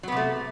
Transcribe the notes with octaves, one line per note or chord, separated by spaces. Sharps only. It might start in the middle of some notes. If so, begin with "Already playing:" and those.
C3 F#3 A3 B3